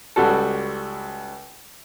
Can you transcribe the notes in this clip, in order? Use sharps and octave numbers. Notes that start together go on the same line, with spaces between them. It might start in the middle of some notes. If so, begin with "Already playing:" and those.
C#2 G3 F#4 A4